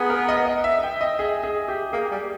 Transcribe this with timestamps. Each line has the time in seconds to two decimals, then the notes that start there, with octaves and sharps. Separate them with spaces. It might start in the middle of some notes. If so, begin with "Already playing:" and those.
Already playing: B3 G#4 A#5
0.10 A#4
0.28 D#5
0.46 D#5
0.64 E5
0.83 G5
1.01 D#5
1.19 G#4
1.43 G#4
1.68 G4
1.93 A#3 G#4
2.11 G3